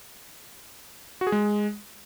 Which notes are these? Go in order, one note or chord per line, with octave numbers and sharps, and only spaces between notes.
F#4
G#4
G#3